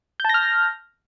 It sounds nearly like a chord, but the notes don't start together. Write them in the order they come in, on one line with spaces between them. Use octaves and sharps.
G6 A5 A#6 F6